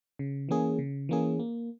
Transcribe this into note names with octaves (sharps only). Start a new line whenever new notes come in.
C#3
E3 A#3 C#4 G#4
C#3
E3 A#3 C#4 G#4
A#3